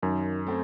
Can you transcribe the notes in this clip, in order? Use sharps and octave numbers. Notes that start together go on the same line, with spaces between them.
F#2 D#3
A3 C4